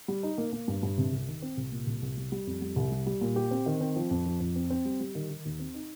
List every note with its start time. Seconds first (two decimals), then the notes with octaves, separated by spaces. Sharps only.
0.08 G3
0.23 D#4
0.38 A#3
0.53 A#3
0.68 G2
0.83 G2
0.98 C3
1.13 C2
1.28 D#3
1.42 C4
1.57 C2
1.72 A#2
1.87 C2
2.02 C2
2.17 G3
2.32 G3
2.47 F2
2.62 G3
2.76 C2
2.91 G3
3.06 G3
3.21 A#2
3.36 G4
3.51 C4
3.66 D#3
3.81 C4
3.96 F3
4.10 F2
4.26 F3
4.40 F2
4.56 C4
4.70 C4
4.85 G3
5.00 G3
5.15 D#3
5.30 D#3
5.45 D#2
5.59 C4
5.74 D#4